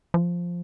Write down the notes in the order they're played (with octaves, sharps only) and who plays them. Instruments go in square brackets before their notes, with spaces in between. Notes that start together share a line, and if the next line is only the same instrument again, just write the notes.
[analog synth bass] F3